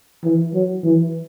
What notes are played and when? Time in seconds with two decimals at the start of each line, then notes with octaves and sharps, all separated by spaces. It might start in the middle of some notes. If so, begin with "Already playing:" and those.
0.24 E3
0.54 F#3
0.84 E3